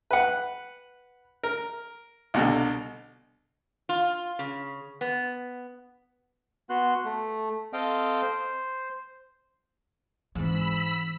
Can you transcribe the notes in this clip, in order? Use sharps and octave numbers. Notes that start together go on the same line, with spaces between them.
B4 F#5
A#4
C2 B2 D3
F4
C#3
B3
B3 F#4 C6 F#6
A3
C4 A4 D#5 F5 G5
C5
G#2 E3 C4 B5 E6 B6